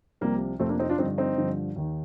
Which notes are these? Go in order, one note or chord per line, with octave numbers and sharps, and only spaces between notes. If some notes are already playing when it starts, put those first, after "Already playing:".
C2 C3 F3 G3 A#3
F2 C3 F3 A3 C4
A#3 D4
C4 D#4
D4 F4
G2 D3 F3 C4 D#4
C4 D#4
G2 D3 F3
D#2 D#3